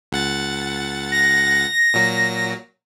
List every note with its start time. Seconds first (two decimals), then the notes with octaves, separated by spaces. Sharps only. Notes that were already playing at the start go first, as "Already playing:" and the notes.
0.12 C#2 F#5 A6
1.12 A#6
1.94 A#2 F#3